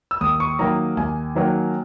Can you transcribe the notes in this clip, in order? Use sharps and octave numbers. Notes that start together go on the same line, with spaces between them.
E6
D#2 D#6
C#6
D#3 F#3 A#3 A#5
D#2 G#5
D#3 F#3 A#3